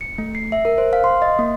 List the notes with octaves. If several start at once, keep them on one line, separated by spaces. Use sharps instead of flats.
C#7
A3
C7
E5
A#4
C5
F5
C6
D#5
A#3